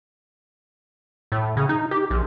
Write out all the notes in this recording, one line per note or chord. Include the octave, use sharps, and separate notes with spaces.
A2
C#3
D#4
G4
A#1